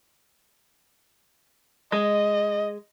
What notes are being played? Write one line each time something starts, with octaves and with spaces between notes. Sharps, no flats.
G#3 D#5